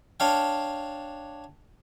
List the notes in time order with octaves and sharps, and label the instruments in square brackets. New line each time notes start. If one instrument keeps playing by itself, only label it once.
[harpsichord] D4 C#5 F5 G5